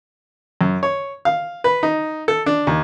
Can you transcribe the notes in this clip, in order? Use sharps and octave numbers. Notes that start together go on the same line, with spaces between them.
F#2
C#5
F5
B4
D#4
A4
D4
D#2